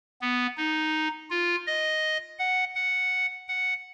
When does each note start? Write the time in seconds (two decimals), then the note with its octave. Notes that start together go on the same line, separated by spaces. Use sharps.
0.21 B3
0.57 D#4
1.30 F4
1.67 D#5
2.39 F#5
2.75 F#5
3.48 F#5